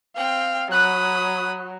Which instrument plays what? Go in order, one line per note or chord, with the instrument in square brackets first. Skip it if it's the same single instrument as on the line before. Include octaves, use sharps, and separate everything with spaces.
[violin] C4 G5 [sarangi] F5
[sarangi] F#3 [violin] B5 D#6 [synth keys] F#6